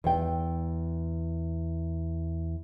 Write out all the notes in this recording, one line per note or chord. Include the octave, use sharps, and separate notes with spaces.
E2 G5